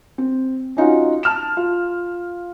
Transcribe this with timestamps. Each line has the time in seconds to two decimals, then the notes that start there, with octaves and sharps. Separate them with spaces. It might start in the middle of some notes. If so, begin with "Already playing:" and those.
0.18 C4
0.77 C#4 D#4 F4 F#4
1.23 A5 F6 E7
1.57 F4